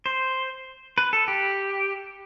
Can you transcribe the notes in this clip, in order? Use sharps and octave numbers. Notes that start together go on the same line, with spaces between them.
C5
B4
A4
G4